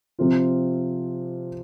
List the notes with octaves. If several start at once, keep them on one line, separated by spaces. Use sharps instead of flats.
C3 F3 C4 F4